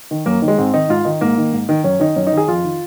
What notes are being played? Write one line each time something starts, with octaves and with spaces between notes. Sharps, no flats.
D#3
F#2 A#3
D#3
G#3
G#2 C4
D#3 D#4
G#2 F4
D#3 D#4
G#2 A#3
D#3
G#2
D#3
F#2 C#4
D#3 D#4
F#2 C#4
D#4
D#3
G#4
F2 F4
D#3